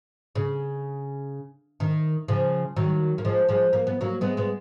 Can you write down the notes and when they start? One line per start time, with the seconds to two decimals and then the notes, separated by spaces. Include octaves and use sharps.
0.35 C#3
1.80 D#3
2.28 C#3 F3
2.76 D#3 F#3
3.18 A#3
3.25 F3 G#3
3.49 F3 G#3
3.73 A#3
3.87 B3
4.01 F#3 A#3
4.21 G#3 B3
4.37 G#3 B3